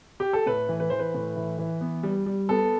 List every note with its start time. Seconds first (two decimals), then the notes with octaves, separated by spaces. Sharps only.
0.20 G4
0.33 A4
0.46 A2 B4
0.69 E3
0.80 B4
0.90 E3 C5
0.99 B4
1.14 A2
1.36 E3
1.58 E3
1.81 B3
2.03 G3
2.26 G3
2.49 B3 A4